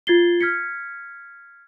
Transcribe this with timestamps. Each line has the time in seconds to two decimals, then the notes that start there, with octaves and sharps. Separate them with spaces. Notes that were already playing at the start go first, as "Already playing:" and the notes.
0.07 F4 G#6 A6 C7 G7
0.41 F6 G#6 B6 C#7